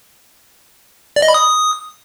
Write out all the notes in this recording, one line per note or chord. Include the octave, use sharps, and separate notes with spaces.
D5
D#5
B5
D#6